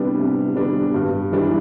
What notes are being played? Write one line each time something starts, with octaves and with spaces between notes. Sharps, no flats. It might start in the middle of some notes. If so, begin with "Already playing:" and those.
Already playing: C3 G3 B3 D4
C3
G3 B3 D4
G2
E3 G3 D4